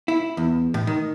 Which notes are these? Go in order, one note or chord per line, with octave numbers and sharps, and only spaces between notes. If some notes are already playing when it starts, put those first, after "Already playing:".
E4
E2
A2
D#3